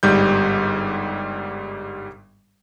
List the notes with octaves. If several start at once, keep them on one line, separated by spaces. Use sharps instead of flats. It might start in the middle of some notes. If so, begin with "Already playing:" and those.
G1 G#2 G3 G6